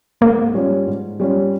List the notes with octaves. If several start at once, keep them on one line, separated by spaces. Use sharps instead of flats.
G#2 A#3
G3 C#4 F4
G#2
G3 C#4 F4